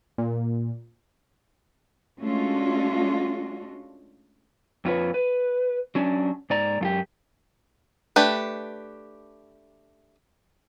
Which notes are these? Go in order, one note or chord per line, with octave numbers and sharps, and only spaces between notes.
A#2
G#3 A3 C#4 D4 F4 F#4
F2 F4 B4 C#5
B4
F#3 C#4 D4
G#2 D5 A#5
F#2 F4 G4
A3 D4 G4 B4